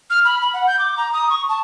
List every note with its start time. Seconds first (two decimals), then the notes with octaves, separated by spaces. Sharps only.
0.10 F6
0.25 B5
0.41 B5
0.54 F#5
0.67 G6
0.79 D6
0.97 A#5
1.13 D#6
1.30 C#6
1.49 A5